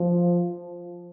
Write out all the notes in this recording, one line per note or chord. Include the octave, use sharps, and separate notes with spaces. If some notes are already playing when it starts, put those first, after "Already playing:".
Already playing: F3